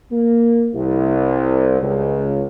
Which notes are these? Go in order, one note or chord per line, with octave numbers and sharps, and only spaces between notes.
A#3
C2
C#2